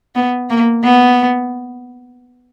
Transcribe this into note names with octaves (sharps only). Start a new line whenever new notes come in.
B3
A#3
B3